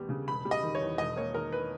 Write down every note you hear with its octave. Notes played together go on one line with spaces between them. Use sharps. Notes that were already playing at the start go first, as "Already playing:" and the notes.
Already playing: D#2 G3 B3
C#3
E1 B5
G3
D#5
D#3
C#5
E2
E1 D#5
A#3 C#5
D#3 A#4
B4